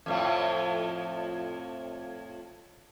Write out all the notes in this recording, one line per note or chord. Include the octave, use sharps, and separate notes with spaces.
F2 A2 F3